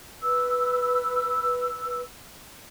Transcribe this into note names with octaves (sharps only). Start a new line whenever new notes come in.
B4 E6